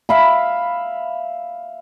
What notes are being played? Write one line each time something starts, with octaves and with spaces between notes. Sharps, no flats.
E5 F5 B5